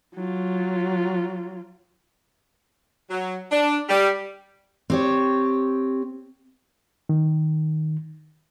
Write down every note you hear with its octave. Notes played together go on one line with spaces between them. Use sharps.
F#3 F4
F#3
D4
G3
C4 G4 C#5
D#3